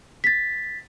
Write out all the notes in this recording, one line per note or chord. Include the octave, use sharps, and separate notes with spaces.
A6 B6